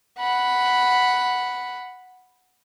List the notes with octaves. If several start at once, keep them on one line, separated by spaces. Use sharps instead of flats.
F#5 B5